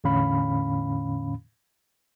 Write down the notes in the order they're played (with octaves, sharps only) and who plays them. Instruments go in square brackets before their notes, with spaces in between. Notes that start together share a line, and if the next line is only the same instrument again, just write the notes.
[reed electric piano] E2 A2 D3 C#4 F5 B5